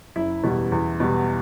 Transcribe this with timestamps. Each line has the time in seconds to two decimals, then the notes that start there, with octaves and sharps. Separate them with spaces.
0.16 F#1 E4
0.43 E2 B2 G3
0.72 E2
1.00 B2 G3